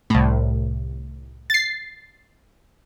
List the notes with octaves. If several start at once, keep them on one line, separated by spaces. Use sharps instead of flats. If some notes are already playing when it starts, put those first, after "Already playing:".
C2 A2
A6 C7